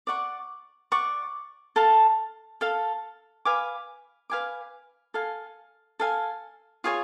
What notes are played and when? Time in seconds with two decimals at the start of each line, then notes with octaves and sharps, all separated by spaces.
0.07 D5 F#5 C#6
0.92 D5 F#5 C#6
1.76 A4 F5 A5
2.61 A4 F5 A5
3.45 B4 F5 G#5 D6
4.30 B4 F5 G#5 D6
5.14 A4 F5 G#5
6.00 A4 F5 G#5
6.84 F4 G#4 C#5 G#5